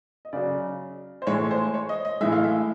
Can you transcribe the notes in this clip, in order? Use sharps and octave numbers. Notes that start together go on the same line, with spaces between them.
D#5
C#3 F#3 D5
C5
A2 E3 G#3 C#5
C5
C#5
D#5
D#5
A2 E3 G#3 E5
F5
E5